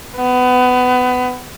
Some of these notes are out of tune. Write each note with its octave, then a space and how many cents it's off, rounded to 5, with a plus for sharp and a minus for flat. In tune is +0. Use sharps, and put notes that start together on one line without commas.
B3 +25